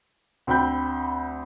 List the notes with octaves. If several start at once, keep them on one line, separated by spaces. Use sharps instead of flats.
D2 C4 G5 B5 G6